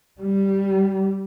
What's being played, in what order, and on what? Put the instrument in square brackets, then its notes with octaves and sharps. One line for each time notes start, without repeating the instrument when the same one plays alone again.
[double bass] G3